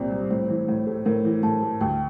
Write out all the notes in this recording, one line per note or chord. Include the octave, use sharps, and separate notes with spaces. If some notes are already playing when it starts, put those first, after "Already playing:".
Already playing: C2 A#2 C4 C5 D5
G3
A2 C5
E3
A2
A3
A2 A#4
E3
A2 A5
A3
D2 G5